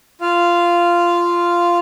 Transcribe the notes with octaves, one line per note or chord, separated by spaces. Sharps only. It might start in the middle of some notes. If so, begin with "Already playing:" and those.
F4 F5